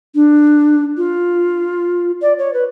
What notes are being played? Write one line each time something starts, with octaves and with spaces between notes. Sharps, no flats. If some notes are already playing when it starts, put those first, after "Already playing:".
D4
F4
D5
C#5
B4